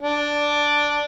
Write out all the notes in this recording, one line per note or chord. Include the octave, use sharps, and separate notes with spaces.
D4